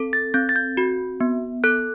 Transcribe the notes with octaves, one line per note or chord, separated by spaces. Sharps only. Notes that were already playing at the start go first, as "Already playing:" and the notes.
Already playing: C4 A4
A6
C4 G6
A6
G6
F#4
B3
A4 F#6